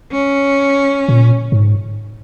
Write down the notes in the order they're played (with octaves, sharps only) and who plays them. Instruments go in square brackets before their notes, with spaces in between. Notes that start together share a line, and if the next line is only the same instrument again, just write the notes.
[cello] C#4
[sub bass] A#2
G#2